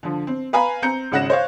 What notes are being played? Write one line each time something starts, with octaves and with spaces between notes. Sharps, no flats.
D3 F3
C4
B4 F5 G#5 A#5 B5
C4 A#5 G6 C#7
G#1 C#3 F#5 F#6 A#6 E7
C5 C#5 F5